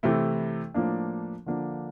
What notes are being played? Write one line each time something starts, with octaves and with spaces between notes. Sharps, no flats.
C3 E3 A3 E4
A2 F3 A#3 D4
D3 F3 A#3 D4